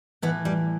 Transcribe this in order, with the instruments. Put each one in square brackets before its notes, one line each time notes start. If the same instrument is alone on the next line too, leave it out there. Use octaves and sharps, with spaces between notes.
[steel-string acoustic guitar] A2 E3 B3
G3